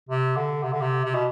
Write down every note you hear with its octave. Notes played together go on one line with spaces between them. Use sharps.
C3
D3
C3
D3
C3
C3
B2